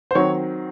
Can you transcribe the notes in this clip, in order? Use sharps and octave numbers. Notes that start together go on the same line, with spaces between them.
C5
D#3 F#3 C4 C#5